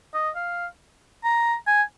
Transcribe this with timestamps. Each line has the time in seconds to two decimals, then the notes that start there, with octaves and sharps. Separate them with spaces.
0.14 D#5
0.36 F5
1.24 A#5
1.67 G#5